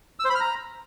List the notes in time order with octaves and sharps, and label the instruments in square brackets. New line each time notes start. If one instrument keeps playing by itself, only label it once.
[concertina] E6
C5
B5
F6
A#5